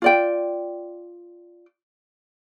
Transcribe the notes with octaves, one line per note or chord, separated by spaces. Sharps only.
F4 D5 G5